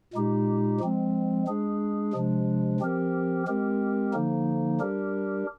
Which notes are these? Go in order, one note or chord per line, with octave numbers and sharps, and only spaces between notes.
A#2 G#3 D#4 G4
F3 G#3 C4
G#3 D4 G#4
C3 F3 G#3 D4
F3 C4 G4 A#4
G#3 C4 G4 A#4
D3 F3 A#3 D#4
G3 D4 G4 A#4